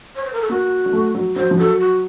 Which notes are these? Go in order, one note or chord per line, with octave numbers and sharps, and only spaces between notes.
C#5
C5
A#4
A4
A#3 F#4
F#3
A3
F#3
F#3 C5
F3
F#3 A4
F#4